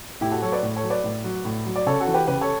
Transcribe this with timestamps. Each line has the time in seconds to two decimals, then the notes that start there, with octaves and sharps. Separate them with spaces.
0.21 A2 E4 G4
0.31 F#4 A4
0.42 F#3 A4 C#5
0.52 B4 D5
0.63 A2
0.76 A4 C#5
0.83 F#3
0.90 B4 D5
1.04 A2
1.24 F#3
1.45 A2
1.66 F#3
1.76 D5
1.86 C#3 A4 C#5
2.00 F#4 A4
2.07 E3
2.14 G4 B4
2.27 C#3 G4 B4
2.41 A4 C#5